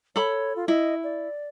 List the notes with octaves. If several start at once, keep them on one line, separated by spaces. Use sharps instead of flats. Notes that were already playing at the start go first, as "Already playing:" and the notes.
A4 C#5 B5
F4
E4 D#5
D5